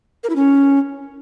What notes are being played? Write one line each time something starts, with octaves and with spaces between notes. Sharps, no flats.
A#4
E4
C#4